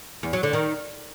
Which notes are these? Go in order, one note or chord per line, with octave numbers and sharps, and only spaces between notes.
E2
F#3
D3
D#3